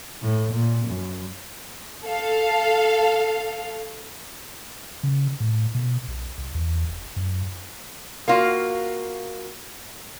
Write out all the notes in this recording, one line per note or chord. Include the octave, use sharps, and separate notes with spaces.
A2
A#2
F#2
A4 F5
C#3
A2
B2
B1
C2
E2
F1
F#2
A#3 F4 F#4